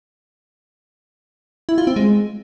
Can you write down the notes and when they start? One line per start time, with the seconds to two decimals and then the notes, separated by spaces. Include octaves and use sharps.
1.69 E4
1.78 F4
1.87 C4
1.96 G#3